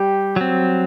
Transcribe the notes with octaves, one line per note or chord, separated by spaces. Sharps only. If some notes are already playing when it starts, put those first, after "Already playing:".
Already playing: G3 G4
F#3 C4